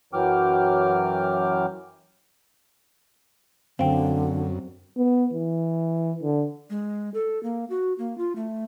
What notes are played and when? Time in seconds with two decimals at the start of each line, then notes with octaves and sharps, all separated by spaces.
0.13 F#2 E3 F#3 G5 D6 F6
3.79 F#2 D3 C4 F5 G5
4.97 B3
5.33 E3
6.23 D3
6.70 G#3
7.14 A4
7.43 A#3
7.70 F#4
7.98 A#3
8.18 F4
8.36 A3